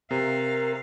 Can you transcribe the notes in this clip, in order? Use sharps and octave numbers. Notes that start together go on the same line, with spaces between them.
C3 A#4 F5